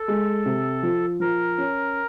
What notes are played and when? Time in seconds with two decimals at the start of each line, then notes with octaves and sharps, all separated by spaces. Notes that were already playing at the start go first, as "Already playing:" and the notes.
Already playing: A4
0.08 G#3
0.46 C3
0.83 F3
1.20 F3 A#4
1.58 C#4